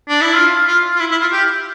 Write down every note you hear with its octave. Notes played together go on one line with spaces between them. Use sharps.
D4
E4
F4
F4
F4
E4
E4
F4
G4